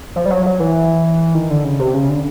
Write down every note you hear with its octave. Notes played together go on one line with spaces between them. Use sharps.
F3
G3
F#3
F#3
E3
D#3
D3
C#3
C3
C#3
D3